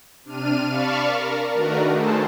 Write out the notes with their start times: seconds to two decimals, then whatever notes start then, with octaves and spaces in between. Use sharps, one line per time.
0.24 C3 D4 F6 D#7
0.65 D5 F5 A5 B5 C#6 F6
1.06 A#4
1.54 D#3 A3 D4 F#4 A#4 B4
1.92 A3 G#4 A4 C5 A5